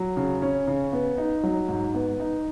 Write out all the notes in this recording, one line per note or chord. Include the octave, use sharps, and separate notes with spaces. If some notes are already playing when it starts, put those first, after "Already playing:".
Already playing: F#3
C#3
C#4
C#3
B3
D#4
F#3
G#2
B3
D#4